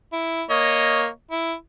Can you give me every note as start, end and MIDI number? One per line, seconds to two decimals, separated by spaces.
0.13 0.42 64
0.50 1.07 58
0.50 1.07 73
0.50 1.07 75
1.31 1.53 64